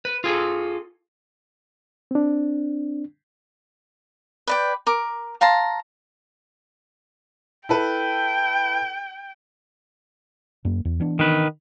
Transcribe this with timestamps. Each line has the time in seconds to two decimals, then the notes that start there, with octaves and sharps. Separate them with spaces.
0.05 B4
0.24 F4 G#4 A4
2.11 C4 D4
4.47 B4 D5 G5
4.87 A#4 D6
5.41 F5 A5 A#5 C6
7.69 E4 A4 B4 G5
10.65 F#2 A#3
10.85 E2
11.00 E3 B3 D4
11.19 D#3 B4